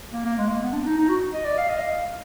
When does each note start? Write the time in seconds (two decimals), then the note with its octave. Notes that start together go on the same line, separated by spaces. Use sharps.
0.13 A#3
0.25 A#3
0.38 G#3
0.49 A#3
0.62 B3
0.73 D4
0.85 D#4
0.98 D#4
1.09 F#4
1.34 D#5
1.45 D5
1.58 F5
1.69 D#5
1.81 F5